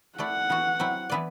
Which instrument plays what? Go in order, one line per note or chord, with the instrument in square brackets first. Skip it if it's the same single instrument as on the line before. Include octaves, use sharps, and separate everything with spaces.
[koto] A3 E4 A4 D5 [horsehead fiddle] F#5
[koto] E3 B3 F#4
F#3 C4 E4
E3 B3 E4 B4 D5